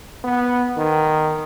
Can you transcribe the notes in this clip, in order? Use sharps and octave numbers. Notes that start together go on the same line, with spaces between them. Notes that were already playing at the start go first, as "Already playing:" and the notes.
B3
D#3